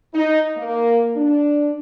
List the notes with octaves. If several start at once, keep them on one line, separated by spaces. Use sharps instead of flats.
D#4
A#3
D4